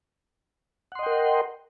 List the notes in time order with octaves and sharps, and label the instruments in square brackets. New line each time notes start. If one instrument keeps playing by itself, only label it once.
[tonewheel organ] F#5
C6
D#5
G5
A#4